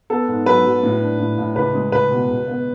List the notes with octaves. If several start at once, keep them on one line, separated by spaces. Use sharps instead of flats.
B3 A4
G#2
F#3 B4
F#3
A2
D4
A2
A2
C#2 B4
G#3
C#2 B4
B2
C#2
B3